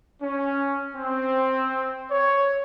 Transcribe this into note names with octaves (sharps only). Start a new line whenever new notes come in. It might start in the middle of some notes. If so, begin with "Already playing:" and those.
C#4
C4
C#5